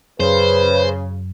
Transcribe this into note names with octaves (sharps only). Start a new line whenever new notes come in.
F#2 C#3 B4 C5